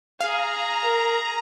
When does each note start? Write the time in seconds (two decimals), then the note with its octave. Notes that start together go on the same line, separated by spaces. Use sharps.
0.20 G#4 F5 A#5
0.84 A#4